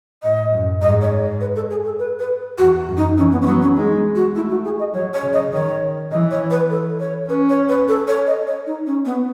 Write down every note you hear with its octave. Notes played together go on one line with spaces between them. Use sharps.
A2 D#5
F#2
G#2 D#5
C#5
B4
A4
G#4
A4
B4
B4
E2 F#4
F#2
D#4
E3 C#4
B3
C#4
F#3 B3
C#4
G#3 D#4
F#4
A3 E4
F#4
G#4
D#5
F#3 C#5
C#5
C#3
D#5
D#3 C#5
E3 D#5
C#5
B4
A4
C#5
C#4 B4
C#5
B4
A4
C#5
D#5
C#5
D#4
C#4
B3